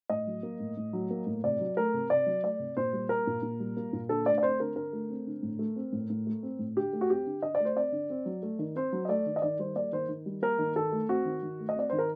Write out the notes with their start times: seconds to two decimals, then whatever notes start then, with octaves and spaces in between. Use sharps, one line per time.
0.10 A2 D#5
0.27 F#3
0.43 A#3
0.60 A2
0.77 A2
0.93 F#3
1.11 A#3
1.27 A2
1.44 C3 D5
1.60 F#3
1.77 A3 A#4
1.94 C3
2.10 C3 D5
2.26 F#3
2.43 A3 D5
2.59 C3
2.77 A#2 C5
2.93 G3
3.09 A#3 A#4
3.27 A#2
3.43 A#2
3.60 G3
3.77 A#3
3.93 A#2
4.09 D3 A4
4.26 A3 D5
4.38 D5
4.43 C4 C5
4.60 D3 A#4
4.76 D3 A#4
4.93 A3
5.10 C4
5.27 D3
5.43 A2
5.59 A3
5.76 C4
5.93 A2
6.10 A2
6.27 A3
6.43 C4
6.59 A2
6.76 D3 G4
6.93 A3
7.01 F#4
7.10 C4 G4
7.26 D3
7.42 D3 D#5
7.55 D5
7.60 A3
7.65 C5
7.76 C4 D5
7.92 D3
8.10 C4
8.26 F#3
8.43 A3
8.59 D#3
8.75 C4 C5
8.92 F#3
9.05 D#5
9.09 A3 D5
9.26 D#3
9.36 D#5
9.42 D#3 D5
9.59 G3 C5
9.75 A#3 D5
9.92 D#3 C5
10.09 D#3
10.26 G3
10.42 A#3 A#4
10.59 D#3
10.76 D#3 A4
10.92 A3
11.09 C4 F#4
11.25 D#3
11.43 D#3
11.60 A3
11.69 D#5
11.76 C4 D5
11.90 D#3 C5
11.99 A#4